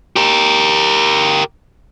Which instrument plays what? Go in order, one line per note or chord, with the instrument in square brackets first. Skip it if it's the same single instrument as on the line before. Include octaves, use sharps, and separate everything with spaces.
[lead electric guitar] G4 A#4